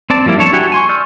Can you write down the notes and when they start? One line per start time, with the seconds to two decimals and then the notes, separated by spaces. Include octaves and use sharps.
0.10 C4 D5 A5
0.26 F3 G3 A#3 E4
0.37 D4 A4 C#5 A5
0.53 E4 F#4 G4 F#5 G#5
0.72 G#5 C6 C#6
0.89 D5 C#6 E6 F6 G6